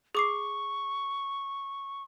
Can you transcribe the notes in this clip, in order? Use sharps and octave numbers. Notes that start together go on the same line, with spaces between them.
G#4 C#6 D6 C7